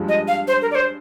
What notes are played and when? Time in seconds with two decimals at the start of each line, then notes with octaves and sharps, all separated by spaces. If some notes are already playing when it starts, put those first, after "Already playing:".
Already playing: G2 F3 G#3
0.08 D#5
0.28 F5
0.48 C5
0.62 A#4
0.71 D5
0.75 C5